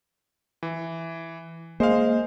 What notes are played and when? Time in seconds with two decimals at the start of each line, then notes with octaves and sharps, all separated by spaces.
0.63 E3
1.80 G#3 A#3 C5 F5